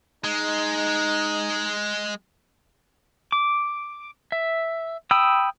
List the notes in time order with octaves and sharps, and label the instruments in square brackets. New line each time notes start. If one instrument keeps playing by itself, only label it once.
[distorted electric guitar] G#3 [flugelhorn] D#4
[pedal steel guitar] D6
E5
G5 B5 D#6 E6